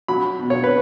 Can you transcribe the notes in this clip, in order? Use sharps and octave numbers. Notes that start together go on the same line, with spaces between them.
F#3 B5
B2
C#5
B4